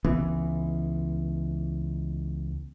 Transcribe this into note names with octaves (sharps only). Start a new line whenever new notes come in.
C#2 E3 B3